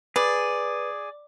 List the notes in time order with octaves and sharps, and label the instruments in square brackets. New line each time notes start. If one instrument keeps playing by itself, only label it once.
[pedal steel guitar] G#4 [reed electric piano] B4 [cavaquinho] D5